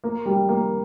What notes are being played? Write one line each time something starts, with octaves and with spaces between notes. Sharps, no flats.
A#3
G3
A#3